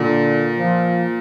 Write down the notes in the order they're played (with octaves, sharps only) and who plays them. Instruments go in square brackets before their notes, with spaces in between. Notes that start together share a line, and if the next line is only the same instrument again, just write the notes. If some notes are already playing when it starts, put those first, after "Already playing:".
Already playing: [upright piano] A#2 [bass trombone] D3
[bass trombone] F3